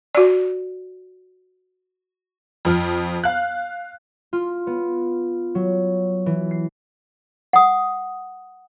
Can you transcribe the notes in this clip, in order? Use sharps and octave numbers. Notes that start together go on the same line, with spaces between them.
F#4 D5
F2 F3 F6
F5 F#6
F4
B3
F#3
E3
C7
F#5 D#6